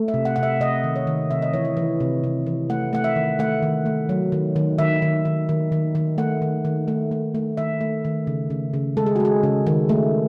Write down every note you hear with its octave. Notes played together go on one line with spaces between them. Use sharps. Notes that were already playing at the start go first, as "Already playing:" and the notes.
Already playing: A3
E5
C3
F#5
C3 F#5
E5
C3 D#5
D#3
C#5
D#3
C3 E5
D#5
E3 C#5
D#5
E3
C3
C3
E3
A3 F#5
A3 F#5
E5
D#3
A3 F#5
D#3
A3
F#3
D#3
D#3
D#3 E5
D#3
D#3
D#3
D#3
D#3
A3 F#5
D#3
D#3
A3
A3
A3
D#3 E5
A3
D#3
C#3
C#3
C#3
G#3 A4
G#4
F#4
G#3 G#4
C#3
D#3
A3